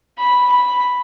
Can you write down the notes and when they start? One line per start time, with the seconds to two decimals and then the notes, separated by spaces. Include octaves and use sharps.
0.18 B5
0.52 B5